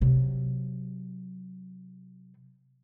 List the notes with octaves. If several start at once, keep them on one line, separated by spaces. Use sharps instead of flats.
C3 F#3